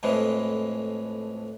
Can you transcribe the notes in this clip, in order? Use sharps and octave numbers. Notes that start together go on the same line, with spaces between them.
F2 A2 E3 F3 G#3